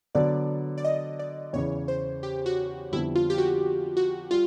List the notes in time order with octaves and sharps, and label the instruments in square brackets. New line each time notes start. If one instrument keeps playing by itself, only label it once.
[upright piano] D3 F#3 B3 D4 [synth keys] D5
[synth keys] D5
D#5
D5
[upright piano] E2 C#3 E3 [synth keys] C#5
[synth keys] C5
G4
F#4
[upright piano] F2 D3 G3 B3 [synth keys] E4
[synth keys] F4
G4
F#4
F#4
[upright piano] G3 [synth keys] F4